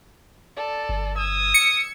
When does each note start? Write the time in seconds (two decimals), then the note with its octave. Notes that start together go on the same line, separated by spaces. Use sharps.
0.56 A4 D5
0.89 G1
1.18 D#6 E6 G#6
1.54 C#7